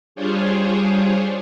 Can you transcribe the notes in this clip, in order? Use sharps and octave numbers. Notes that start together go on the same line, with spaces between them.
G3 D4 F4 G#4 C5 C#5